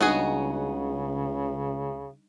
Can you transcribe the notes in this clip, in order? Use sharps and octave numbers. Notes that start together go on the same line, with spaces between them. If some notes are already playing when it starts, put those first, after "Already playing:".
C#2 C#3 G3 B3 D4 D#4 F#4 G#4